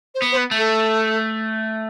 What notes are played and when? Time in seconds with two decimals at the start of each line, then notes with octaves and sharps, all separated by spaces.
0.15 C5
0.22 B3
0.32 C5
0.37 B4
0.51 A3
0.58 A4